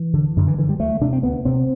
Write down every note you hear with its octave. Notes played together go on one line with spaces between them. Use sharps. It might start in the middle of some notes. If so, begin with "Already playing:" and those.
Already playing: E3
D3
F#2 D3
E3
D3 E3
G3
D2 A3
C3 D4
C4
D2 B3
C3 C4